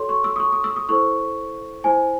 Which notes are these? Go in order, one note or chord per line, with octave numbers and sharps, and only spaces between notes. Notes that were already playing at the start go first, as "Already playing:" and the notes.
Already playing: F#4 A4 C#5 C6
C#6
E6
D#6
C#6
D#6
E6
D#6
E4 A4 C5 C#6
E4 C5 G#5